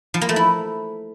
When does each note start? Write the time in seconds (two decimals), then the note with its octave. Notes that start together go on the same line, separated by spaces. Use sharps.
0.14 F3
0.21 A#3
0.29 A3
0.36 E4